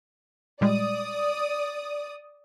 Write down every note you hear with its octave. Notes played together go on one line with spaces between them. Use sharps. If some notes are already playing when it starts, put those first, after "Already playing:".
A#2 G3 G#3 D5 D#6